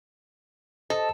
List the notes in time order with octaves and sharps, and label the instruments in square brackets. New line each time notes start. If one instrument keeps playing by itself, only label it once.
[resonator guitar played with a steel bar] A4 [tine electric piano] C5 D#5 A5